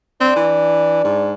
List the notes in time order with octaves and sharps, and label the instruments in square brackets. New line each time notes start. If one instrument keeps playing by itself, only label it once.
[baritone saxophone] C4 [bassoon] D4
[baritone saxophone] E3
G#2